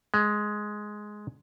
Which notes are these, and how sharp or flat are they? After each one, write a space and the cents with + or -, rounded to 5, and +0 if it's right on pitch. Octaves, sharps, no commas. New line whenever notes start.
G#3 +10